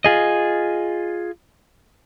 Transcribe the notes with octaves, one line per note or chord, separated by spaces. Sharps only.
F4 G#4 D#5